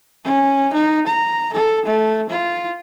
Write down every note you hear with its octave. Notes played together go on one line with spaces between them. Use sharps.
C#4
D#4
A#5
A4
A3
F4